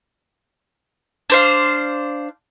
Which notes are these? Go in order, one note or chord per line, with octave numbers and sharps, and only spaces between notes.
D4 C5 F5